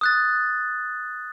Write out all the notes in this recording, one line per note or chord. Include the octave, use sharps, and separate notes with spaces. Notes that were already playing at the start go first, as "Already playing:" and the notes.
D#6 F#6 A6